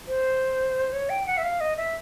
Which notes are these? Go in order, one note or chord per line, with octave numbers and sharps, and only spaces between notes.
C5
C#5
G5
F#5
E5
F5
D#5
E5